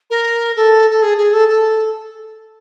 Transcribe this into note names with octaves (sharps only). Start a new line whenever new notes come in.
A#4
A4
A4
G#4
G#4
A4
A4